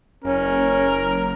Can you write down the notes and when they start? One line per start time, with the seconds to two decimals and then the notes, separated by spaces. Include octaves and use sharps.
0.24 F#1 C#4 A#4